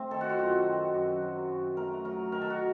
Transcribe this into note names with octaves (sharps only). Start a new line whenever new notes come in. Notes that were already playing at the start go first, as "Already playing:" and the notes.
Already playing: A3 C4
D#3 A4
F#4
F4
F#2 F#4
D#3
F#2
F#3
F#2
A3 A#4
F#3 A#4
D#3 A#4
A4
F#4